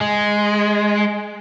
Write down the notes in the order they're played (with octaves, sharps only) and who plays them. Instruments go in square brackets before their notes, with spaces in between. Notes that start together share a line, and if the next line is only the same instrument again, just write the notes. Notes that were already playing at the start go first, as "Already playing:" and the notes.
[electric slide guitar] G#3